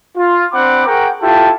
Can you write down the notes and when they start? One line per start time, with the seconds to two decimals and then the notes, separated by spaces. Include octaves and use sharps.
0.17 F4
0.53 C4 D4 F#5 B5 D6
0.86 F#4 G#4 A#4 F#5 G5
1.21 E4 F4 G4 A4 A5